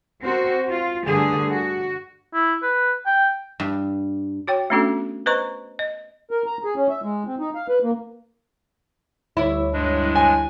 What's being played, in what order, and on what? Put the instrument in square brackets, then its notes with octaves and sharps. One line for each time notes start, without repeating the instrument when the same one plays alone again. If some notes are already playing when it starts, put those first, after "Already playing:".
[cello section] C4 F#4 A#4 C5
F4
G2 D3 A3 G#4
F#4
[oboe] E4
B4
G5
[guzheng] G2
[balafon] F#4 C#5 G5
A3 B3 C#4 D4 F#4 A4
B4 C5 D#5 A#5 C#6
D#5
[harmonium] A#4
A#5
G#4
C#4
E5
G#3
C4
D#4
F5
B4
A#3
[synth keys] D2 G3 C#5 [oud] E4
[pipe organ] G2 G#3 D4
[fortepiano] G#5